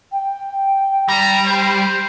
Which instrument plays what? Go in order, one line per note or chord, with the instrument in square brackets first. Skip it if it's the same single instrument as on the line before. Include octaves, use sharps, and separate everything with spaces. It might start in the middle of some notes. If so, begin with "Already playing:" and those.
[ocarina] G5
[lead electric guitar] G3 [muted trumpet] A#5
[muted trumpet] C5